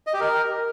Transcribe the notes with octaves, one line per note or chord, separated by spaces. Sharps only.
D#5
G4
A#4